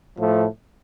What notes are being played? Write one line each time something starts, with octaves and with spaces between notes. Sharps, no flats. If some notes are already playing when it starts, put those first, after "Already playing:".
A2 F3 A3